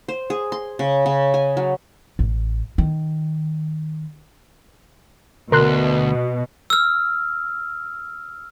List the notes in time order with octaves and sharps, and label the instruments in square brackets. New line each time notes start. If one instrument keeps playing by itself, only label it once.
[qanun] C5
G#4
C6
C#3
C#3
G#5
F#3
[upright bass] A1
D#3
[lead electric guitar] D2 [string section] B2 [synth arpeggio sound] A#4 C6 F#6
[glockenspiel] E6 F6